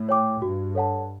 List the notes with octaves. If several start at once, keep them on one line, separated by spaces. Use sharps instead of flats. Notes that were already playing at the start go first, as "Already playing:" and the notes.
Already playing: A2
C#5 G5 D6
G2 F#4
A4 C#5 F#5 A5